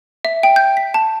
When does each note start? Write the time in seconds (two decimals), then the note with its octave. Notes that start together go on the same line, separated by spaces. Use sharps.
0.25 E5
0.43 G5
0.56 G6
0.77 B6
0.94 A5